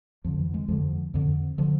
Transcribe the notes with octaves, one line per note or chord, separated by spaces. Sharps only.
F2 D3 F3
E3
G#3
F2 D3 F3
F2 D3
D3 F3